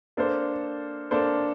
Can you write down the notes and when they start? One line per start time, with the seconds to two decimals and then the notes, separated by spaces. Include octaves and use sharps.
0.17 A#3 D4 A4 C5
1.11 A#3 D4 A4 C5